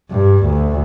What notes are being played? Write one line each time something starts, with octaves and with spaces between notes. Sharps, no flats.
G2
D2